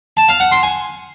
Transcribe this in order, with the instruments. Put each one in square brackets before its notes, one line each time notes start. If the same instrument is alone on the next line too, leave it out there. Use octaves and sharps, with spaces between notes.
[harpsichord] A5
F5
F#5
C6
G#5